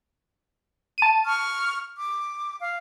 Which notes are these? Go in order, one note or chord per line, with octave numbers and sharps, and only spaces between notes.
A5 D#7
C#6 F6
D6
F5